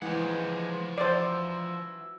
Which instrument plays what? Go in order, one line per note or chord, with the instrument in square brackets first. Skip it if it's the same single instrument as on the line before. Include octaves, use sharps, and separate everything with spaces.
[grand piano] E3 [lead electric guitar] F3 F#5 [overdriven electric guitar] G#3 G4
[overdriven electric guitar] F#4 E5 [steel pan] C5 D5